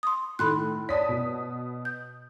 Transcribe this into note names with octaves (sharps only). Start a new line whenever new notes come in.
C6 D#6
A2 D#3 A3 B5 C6 F#6
C#5 D5 A5 D#6 B6
B2 B3
G6